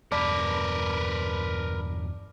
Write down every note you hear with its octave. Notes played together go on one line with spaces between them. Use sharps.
E2 G2 B2 A#4 B4 D5 A5 D6